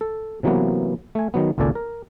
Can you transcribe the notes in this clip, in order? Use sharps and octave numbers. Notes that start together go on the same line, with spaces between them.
A4
C3 E3 F#3 A#3 B3
A3 G#5
D#3 F#3 B3
G#1 C#2 A#2 A4 D5 G#5
A#4